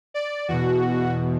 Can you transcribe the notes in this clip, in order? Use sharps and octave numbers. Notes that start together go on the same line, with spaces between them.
D5
E2 B2 F#4